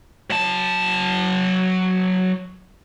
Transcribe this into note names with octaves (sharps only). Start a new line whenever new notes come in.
F#3 A5